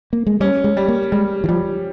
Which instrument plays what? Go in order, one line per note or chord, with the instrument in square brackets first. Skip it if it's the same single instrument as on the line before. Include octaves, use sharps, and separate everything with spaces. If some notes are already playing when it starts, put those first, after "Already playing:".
[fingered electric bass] A#3
G#3
[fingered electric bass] G3 [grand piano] C#4
[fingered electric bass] G#3
[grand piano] G3
[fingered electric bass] A#3
[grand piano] G3 [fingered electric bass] G#3
[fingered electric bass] E3
[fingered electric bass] F3 [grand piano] G3